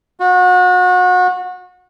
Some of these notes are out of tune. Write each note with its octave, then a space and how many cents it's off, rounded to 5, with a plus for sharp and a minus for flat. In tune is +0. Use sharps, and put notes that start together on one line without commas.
F#4 -30